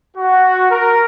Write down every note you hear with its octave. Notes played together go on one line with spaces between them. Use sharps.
F#4
A#4